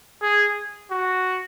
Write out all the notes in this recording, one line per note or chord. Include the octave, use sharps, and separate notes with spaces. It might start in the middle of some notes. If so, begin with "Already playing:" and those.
G#4
F#4